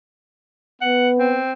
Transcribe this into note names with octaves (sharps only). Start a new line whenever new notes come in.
B3 F#5
C4